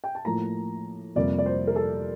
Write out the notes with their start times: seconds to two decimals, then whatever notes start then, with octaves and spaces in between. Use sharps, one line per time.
0.04 G5
0.15 A5
0.25 A2 F3 A#3 A#5
1.16 F2 C3 G3 A#3 D5
1.38 D5
1.46 C5
1.67 A#4
1.76 A4